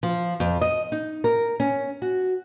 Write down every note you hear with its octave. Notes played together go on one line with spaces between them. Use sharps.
F3
F2
D#5
D#4
A#4
C#4
F#4